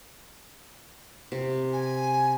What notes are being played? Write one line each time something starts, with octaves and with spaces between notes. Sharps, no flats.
C3
G#5